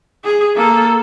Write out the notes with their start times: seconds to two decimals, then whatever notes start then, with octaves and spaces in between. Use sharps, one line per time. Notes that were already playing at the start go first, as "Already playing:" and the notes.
0.24 G#4
0.56 A#3 A4